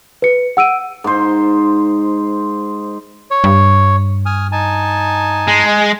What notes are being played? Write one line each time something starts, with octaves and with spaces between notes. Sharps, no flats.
B4 C#7
F#5 E6 D7 D#7
G#2 C5
C#5
G2
G#5 D#6 F6
D#4 G#5 A5
G#3